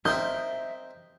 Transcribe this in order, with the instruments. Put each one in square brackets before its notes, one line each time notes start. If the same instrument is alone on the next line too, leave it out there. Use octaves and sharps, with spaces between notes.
[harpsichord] C4 A#4 D#5 [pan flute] E5 [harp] G6